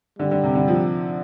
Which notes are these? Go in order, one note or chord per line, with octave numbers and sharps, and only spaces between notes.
D3 G3
D3
C3
D3
F3